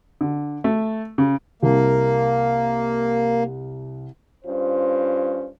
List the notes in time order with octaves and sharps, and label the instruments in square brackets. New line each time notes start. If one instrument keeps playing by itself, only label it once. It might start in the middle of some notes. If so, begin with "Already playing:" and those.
[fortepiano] D3
A3
C#3
[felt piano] C2 [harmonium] A#3
[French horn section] G2 C#4 F4 C5